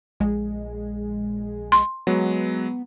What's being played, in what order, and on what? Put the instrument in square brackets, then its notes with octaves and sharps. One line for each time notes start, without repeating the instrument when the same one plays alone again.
[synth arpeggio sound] A#1 G#3
[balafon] C6
[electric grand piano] F#3 G#3 [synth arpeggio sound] B3